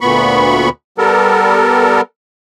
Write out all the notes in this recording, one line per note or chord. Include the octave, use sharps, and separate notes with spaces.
D2 A#2 B3 B5 C#6
G3 B3 A4 A#4